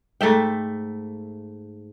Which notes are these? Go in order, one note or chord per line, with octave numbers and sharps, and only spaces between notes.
G#2 A3 E5 G5